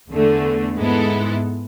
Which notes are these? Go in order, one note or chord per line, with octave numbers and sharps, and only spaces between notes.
E2 D3 A3
G#2 G#3 B3 E4 A4